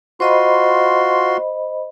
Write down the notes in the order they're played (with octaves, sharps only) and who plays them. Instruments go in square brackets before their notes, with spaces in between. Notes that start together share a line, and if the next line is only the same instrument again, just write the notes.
[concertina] F4 F#4 C6 [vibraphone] C5 D#5 B5